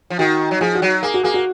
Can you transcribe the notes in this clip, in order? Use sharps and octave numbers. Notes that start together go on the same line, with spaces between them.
F3
D#3 F#4
F#3
F3 G#4
F#4
F#3
A#3 G#4
F#4
A#3 G#4
F#4